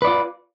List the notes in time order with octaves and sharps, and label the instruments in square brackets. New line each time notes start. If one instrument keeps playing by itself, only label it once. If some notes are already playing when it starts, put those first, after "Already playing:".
[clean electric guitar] B4
D5
F4